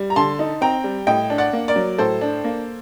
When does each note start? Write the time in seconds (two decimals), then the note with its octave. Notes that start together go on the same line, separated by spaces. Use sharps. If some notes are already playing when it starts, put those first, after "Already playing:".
Already playing: G3
0.10 A#5
0.16 D3 A5 C6
0.39 D#4
0.61 C4 G5 A#5
0.84 G3
1.07 A2 D#5 G5
1.30 D4
1.38 D5 F#5
1.53 A#3
1.68 A#4 D5
1.76 F#3
1.98 A2 A4 C5
2.21 D4
2.44 A#3